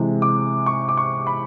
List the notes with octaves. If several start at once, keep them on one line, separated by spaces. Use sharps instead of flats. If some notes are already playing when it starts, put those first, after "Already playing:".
Already playing: C3 E3 G#3
D6
C#6
D6
C#6
B5